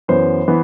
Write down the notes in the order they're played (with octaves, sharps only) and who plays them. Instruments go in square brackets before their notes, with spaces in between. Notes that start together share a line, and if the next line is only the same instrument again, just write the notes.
[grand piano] F#2 E3 B3 C5
E3 B3